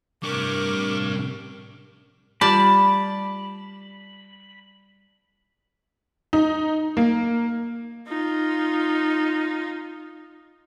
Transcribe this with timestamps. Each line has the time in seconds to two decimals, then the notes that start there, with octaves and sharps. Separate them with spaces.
0.23 A2 C3 G3 D4 A#4 C#6 D6
2.41 G3 F4 G4 D5 A5 B5
6.33 D#4
6.97 A#3
8.08 D#4 F4